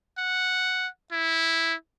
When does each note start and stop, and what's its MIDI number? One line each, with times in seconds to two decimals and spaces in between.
0.18 0.87 78
1.12 1.74 64